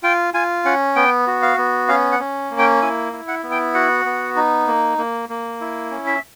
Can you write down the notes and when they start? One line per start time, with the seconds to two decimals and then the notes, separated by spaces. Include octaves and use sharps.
0.03 F4 G5
0.34 F4 G#5
0.65 C#4 F#5
0.96 B3 G5
1.27 F#4
1.42 F5
1.57 B3
1.88 C#4 F5
2.12 F#5
2.19 C#4
2.51 A#3
2.59 G5
2.82 E4 G#5
3.13 E4
3.28 F#5
3.43 B3
3.51 G5
3.74 F#4 F#5
4.05 B3
4.36 D#4
4.67 A#3
4.98 A#3
5.29 A#3
5.61 E4
5.91 C#4
6.06 E5